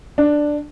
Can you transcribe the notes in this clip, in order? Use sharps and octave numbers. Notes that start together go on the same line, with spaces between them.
D4